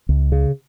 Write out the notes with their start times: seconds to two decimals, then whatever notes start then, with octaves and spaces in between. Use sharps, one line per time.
0.09 C#2
0.32 C#3